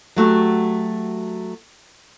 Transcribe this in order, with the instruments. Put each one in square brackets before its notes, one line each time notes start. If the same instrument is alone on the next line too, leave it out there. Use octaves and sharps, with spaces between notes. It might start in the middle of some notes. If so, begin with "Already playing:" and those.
[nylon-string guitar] F#3 A3 F#4 G4